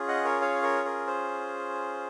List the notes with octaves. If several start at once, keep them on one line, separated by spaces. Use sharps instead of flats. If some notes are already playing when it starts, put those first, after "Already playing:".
Already playing: C#4 F4 G#4
D#5 F#5
A#4 C#5
C#5 F5
A#4 C#5
A#4
C5